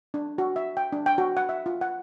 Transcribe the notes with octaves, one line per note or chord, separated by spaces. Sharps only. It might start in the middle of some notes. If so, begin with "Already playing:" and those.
D4
F#4
E5
G5
D4
G5
F#4
F#5
E5
F4
F#5